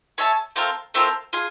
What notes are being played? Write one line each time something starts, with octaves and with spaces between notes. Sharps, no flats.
G#4 C#5 E5 A5
A3 C4 F4 A#4
A3 C4 F4 A#4
F4 G#4